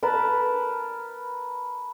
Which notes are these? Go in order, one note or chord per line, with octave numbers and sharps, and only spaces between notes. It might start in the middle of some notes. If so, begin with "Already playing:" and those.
A#4 B4 A5